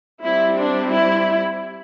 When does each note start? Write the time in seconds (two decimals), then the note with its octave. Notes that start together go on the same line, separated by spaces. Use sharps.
0.22 G3 C4 E4
0.56 D4
0.90 E4